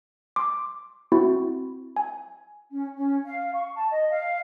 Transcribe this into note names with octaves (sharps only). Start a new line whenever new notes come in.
C6 D6
C4 E4 F#4
G#5
C#4
C#4
F5
C#6
A5
D#5
F5